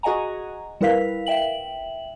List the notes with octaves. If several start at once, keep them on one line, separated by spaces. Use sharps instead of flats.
F#4 G#4 D#5 F#5 G#5 A#5
G3 E4 A#4 B4 F5 B6
E5 G5 F#7